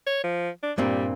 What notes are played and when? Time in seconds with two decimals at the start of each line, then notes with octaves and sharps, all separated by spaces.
0.07 C#5
0.24 F3
0.63 D4
0.78 G2 A#2 G3 C4